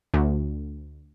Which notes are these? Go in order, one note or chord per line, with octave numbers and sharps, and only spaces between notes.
D2